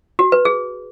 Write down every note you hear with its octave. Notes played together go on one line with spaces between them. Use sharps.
F#4
B4
G#4